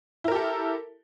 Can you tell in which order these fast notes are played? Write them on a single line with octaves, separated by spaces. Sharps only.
E4 A#4 G4 A4